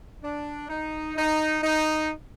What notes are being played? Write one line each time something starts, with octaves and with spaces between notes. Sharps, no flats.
D4
D#4
D#4
D#4